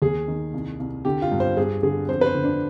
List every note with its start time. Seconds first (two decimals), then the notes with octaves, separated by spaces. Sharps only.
0.02 D#2 G#4
0.28 D#3
0.53 C2
0.80 C2
1.05 D3 G4
1.22 F4
1.32 G2
1.40 C5
1.57 G2 G#4
1.83 D3 G#4
2.09 F2 C5
2.21 B4
2.26 C5
2.35 D3
2.44 D4